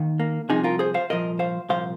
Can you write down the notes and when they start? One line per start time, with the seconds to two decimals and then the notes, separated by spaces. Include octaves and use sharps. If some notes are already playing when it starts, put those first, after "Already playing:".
Already playing: D#2 D#3
0.20 A#3
0.49 C2 C3 F3 D#4 G#4
0.64 F4 A#4
0.79 G#4 C5
0.94 C5 F5
1.10 C2 A#2 F3 A#4 D#5
1.39 C5 F5
1.69 C2 A#2 F3 C5 F5